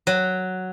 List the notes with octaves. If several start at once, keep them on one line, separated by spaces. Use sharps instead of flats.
F#3